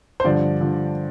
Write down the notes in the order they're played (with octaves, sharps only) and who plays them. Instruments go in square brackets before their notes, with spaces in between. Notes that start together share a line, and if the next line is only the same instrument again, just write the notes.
[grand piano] C5
G2 D3 F3 D5
D3 F3